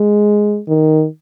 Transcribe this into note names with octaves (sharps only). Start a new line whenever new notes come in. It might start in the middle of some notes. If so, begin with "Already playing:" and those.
Already playing: G#3
D#3